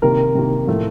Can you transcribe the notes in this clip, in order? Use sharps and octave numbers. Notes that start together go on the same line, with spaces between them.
C3 D#3 A#3 A#4
C3 D#3 A#3
A2 F3 A3